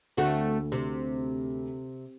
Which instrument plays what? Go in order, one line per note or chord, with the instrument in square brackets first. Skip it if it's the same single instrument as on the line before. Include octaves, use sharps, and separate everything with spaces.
[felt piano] D2 [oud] A3 C4 F#4
[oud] C3